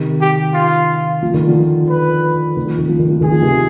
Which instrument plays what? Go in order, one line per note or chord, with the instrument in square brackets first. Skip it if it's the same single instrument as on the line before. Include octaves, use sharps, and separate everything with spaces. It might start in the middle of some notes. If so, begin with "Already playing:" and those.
Already playing: [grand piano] C3 D#3
[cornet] G4
F4
[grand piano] F3
D#3
D3 F3
[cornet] B4
[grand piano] D#3
F3
D#3
F3
D#3
F3
[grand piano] D#3 [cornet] G#4
[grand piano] F3
C3 D#3